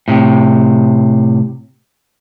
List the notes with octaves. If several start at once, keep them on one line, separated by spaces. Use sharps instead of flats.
A2 C3